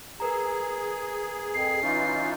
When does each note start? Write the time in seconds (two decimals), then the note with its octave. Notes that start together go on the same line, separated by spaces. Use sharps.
0.20 G#4 A#4 B4 A#5
1.54 F2 C7
1.82 E3 C#4 D#4 F4